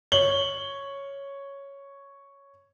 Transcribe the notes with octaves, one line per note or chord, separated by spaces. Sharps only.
C#5 F#7 G7